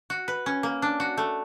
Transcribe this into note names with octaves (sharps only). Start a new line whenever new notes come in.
F#4
B4
C#4
A#3
D4
F#4
A3